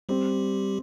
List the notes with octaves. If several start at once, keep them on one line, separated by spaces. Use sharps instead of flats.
G3 C4 G4